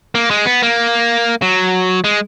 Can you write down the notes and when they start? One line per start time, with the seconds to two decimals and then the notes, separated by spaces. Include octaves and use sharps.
0.15 A#3
0.30 G#3
0.46 B3
0.62 A#3
1.42 F#3
2.04 G#3